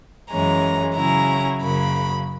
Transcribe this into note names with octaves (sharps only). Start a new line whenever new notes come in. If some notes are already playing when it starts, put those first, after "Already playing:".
F#2 E3 G#3 C#4 A#5
C#3 F#3 C#4 E4 A#5
F#2 C#3 F#3 A#3 B5